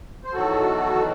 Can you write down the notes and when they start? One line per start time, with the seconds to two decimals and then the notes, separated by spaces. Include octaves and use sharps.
0.24 C5
0.33 E2 D#3 F#3 F#4 A4